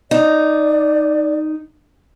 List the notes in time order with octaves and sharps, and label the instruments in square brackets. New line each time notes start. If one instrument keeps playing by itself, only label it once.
[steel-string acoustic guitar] D#4 [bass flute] D5